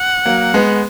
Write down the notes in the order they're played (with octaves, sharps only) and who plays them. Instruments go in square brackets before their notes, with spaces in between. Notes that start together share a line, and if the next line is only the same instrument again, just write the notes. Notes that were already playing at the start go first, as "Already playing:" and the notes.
Already playing: [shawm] F#5
[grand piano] F#3 A#3
G#3 B3